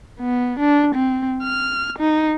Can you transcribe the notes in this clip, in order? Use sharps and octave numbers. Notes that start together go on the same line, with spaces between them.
B3
D4
C4
F6
D#4